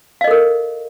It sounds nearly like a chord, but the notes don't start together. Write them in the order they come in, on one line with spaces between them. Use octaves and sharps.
F5 D#5 A4 A#4